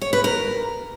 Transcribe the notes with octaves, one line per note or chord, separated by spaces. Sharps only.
C#5
B4
A#4